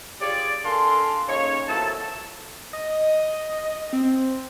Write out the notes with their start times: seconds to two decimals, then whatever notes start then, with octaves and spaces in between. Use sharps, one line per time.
0.21 F4 G4 G#4 C#5 D5
0.64 D4 A4 A#4 F5 G#5 C6
1.28 A#2 C#3 D#4 C#5
1.68 B2 F3 E4 A4 A#4 A5
2.73 D#5
3.93 C4